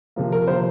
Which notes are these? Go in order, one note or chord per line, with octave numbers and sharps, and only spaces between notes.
C3 F3 A#3
A#4
C3 F3 A#3 C5